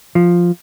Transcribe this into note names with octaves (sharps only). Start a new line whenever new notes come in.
F3